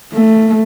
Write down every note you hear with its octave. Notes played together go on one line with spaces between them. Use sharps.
A3